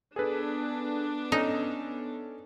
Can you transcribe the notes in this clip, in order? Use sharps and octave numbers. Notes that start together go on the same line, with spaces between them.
B3 D4 G#4 A4 B4
C#4 D#4 A4